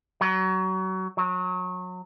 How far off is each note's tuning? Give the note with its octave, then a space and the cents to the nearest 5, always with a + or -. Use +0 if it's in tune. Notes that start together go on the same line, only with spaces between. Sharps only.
F#3 +25
F#3 -25